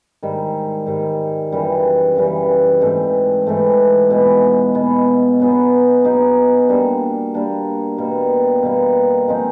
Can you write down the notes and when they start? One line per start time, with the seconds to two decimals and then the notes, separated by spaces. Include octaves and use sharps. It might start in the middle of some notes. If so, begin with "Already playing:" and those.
0.23 G#2 D#3 G3
0.86 G#2 D#3 G3
1.52 F#2 C#3 E3 G3
2.16 F#2 C#3 E3 G3
2.81 G#2 E3 A3 C4
3.46 G#2 E3 A3 C4
4.10 B2 G#3 B3
4.75 B2 G#3 B3
5.40 F#3 B3 D#4 G#4
6.04 F#3 B3 D#4 G#4
6.69 G3 A#3 D4
7.34 G3 A#3 D4
7.98 B2 G3 A#3
8.63 B2 G3 A#3
9.28 F3 G#3 C4 D#4